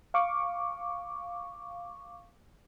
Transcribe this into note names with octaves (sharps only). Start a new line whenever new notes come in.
F5 C#6 D6